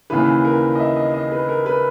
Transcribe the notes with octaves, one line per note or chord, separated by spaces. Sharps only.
D#2 C#3 E3 B4
A#4
D#5
E5
D#5
D#5
B4
A#4
B4